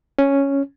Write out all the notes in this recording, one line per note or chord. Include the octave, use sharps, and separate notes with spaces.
C#4